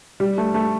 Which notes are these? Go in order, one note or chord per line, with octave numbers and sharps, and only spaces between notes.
G3
A3
A3